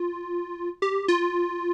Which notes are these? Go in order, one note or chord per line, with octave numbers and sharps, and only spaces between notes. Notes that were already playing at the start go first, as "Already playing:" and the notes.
Already playing: F4
G4
F4